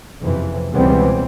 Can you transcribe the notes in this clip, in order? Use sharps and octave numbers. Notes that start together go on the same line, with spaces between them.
F#1 F2 C3 E3
C#2 B2 E3 G3 B3 C4